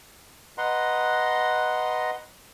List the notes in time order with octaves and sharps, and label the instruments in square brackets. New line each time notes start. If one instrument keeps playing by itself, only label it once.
[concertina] B4 D#5 F#5 A#5 C6